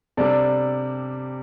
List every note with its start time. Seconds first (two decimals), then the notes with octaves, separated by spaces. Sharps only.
0.17 C3 G3 D4 A4 D5